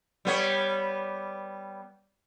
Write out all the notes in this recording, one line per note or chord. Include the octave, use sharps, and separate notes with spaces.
G3 B3 C#5